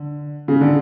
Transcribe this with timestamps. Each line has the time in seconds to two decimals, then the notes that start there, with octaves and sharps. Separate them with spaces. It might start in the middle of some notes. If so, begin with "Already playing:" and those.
Already playing: D3
0.48 C#3
0.61 D3